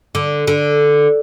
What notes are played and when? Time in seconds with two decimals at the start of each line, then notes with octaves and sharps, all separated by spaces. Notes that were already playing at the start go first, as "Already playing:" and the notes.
0.15 D3
0.47 D3